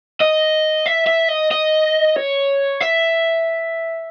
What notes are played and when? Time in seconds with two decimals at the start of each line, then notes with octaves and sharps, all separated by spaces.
0.20 D#5
0.86 E5
1.06 E5
1.28 D#5
1.51 D#5
2.16 C#5
2.80 E5